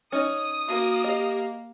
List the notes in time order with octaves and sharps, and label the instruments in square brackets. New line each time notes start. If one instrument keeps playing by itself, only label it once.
[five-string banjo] C#4 D#4 [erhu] D#6
[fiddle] A#3 [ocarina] F#4
[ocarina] G4 [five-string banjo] D#5